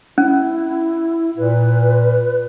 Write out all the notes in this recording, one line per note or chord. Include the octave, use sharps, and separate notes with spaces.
C#4 E4
A#2 B4